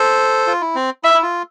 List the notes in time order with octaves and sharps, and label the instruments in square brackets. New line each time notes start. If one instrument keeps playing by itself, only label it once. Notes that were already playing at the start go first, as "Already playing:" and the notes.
Already playing: [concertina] A4 C5
F4
E4
C4
[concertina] E4 [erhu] E5
[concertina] E4
F4